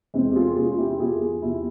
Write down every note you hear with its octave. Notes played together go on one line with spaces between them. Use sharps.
E2 G#3 C4
G4
F4 G#4
E2 C#4 F4
F4
E4 G4
E2 F4 G#4
E2 E4 G4